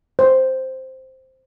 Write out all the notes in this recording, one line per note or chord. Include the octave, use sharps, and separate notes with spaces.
C5